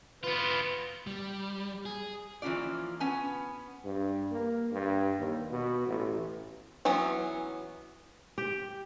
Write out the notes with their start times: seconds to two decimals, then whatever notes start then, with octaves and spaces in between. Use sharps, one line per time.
0.23 B3 F4 B4
1.07 G3
1.85 G#4
2.42 E3 F3 A#3 C#4 F4 D5
3.00 B3 C#4 G#5
3.85 G2
4.32 A#3
4.72 G2
5.19 D#2
5.51 B2
5.87 A1
6.85 E3 F#3 B3 C#4
8.38 G4